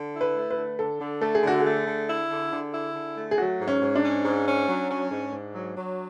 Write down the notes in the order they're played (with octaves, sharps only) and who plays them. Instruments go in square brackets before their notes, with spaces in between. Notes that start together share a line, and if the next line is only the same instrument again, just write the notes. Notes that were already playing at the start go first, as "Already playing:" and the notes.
Already playing: [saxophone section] D3
E4
[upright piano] B4
[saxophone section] A3
[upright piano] B4
[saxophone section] D3
[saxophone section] D3 [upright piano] A4
[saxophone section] D3
[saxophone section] A3 [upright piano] A4
[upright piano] G#4
[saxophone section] D3 [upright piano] F#4
[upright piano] G#4
[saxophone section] A3
D3
E4
D3
D3
E4
D3
A3
[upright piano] G#4
[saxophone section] F#3 [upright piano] F#4
[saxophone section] G#2
[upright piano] C#4
[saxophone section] G#2
[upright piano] D4
[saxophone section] C#4
G#2
C#4
F#3
C#4
G#2
G#2
F#3
F#3